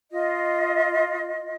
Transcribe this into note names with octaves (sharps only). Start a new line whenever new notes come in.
F4 D#5